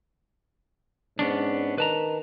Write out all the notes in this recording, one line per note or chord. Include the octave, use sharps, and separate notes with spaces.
G#2 B3 C#4 D4
D#3 B4 A5 A#5